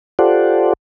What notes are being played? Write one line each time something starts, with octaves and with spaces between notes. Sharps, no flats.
F4 G4 A4 C5 D5 F#5